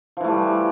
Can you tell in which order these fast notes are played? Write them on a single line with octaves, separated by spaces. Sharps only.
F3 E3 A3 G3